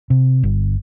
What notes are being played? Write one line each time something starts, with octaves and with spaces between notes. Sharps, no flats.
C3
G1